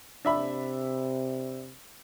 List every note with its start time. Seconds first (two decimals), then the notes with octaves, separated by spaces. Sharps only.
0.25 C3 D4 E5 B5